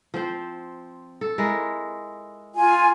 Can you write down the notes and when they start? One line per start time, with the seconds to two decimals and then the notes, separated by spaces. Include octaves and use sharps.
0.14 F3 C4 C5
1.21 A4
1.38 G#3 E4 A#4
2.54 F4 G#5